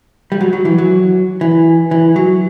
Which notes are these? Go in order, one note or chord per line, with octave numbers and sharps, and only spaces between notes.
G3
F#3
F#3
E3
F#3
E3
E3
F#3